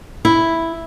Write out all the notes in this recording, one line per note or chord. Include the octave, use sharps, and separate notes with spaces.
E4